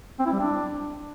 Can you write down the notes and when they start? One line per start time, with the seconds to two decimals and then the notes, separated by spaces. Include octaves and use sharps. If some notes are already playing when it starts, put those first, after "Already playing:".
0.19 C4
0.26 E4
0.33 G3
0.39 D4